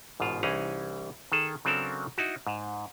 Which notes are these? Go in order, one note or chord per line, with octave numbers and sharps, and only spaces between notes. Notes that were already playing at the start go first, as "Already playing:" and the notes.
A1 G#2 B2 F4
C2 E3 C#4 D#4 G#4 A#5
D#3 G#4 A4
C#3 F#3 C4 D4 A4 A#4
D#4 E4 F#4
G#2